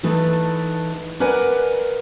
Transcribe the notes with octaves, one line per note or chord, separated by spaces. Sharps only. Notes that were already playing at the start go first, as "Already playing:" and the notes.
E3 A3 D#4 A4 B4
A#4 B4 D5 F#5 G#5